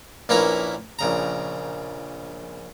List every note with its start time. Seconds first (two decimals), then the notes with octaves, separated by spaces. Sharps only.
0.29 A#1 A#3 C#4 E4 B4 A#5
0.99 A#1 C#3 A#5